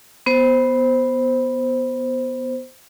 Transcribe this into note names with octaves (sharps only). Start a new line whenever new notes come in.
B3 C5